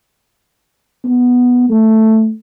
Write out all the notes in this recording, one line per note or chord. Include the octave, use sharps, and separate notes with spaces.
B3
A3